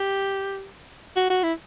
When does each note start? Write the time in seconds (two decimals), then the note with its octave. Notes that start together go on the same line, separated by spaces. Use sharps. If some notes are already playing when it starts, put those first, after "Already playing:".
Already playing: G4
1.16 F#4
1.30 F#4
1.43 E4